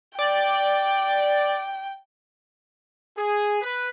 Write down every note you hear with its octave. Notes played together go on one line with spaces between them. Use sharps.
D5 G5
G#4
B4